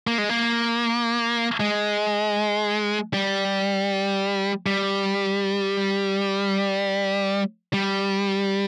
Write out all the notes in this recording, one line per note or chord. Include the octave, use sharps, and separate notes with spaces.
A#3
G#3
A#3
G#3
G3
G3
G3